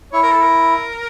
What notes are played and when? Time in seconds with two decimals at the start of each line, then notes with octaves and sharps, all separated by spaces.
0.12 E4 C#5
0.23 A#4
0.31 A4
0.42 A#4